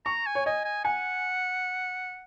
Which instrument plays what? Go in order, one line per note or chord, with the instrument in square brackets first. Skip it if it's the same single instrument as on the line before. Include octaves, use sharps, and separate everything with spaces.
[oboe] A#5 [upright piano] C#6
[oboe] G#5
[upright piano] C#5
[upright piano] D#5 [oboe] G#5
[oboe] G#5
[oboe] F#5 [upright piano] G#5